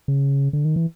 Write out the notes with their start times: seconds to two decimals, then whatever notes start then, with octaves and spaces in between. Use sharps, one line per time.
0.08 C#3
0.53 D3
0.65 D#3
0.76 E3